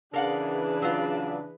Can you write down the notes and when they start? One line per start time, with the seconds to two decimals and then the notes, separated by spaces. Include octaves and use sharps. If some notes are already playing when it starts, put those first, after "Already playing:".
0.14 C#3 E3 D4 G#4 A#4 B4 F5 F#5
0.82 F#3 F4